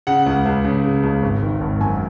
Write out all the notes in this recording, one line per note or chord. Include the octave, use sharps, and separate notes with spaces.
C#3 F#5
C#2
C#2
C#3
C#3
C#2
G#1
D#3
G#1
F#2 G#5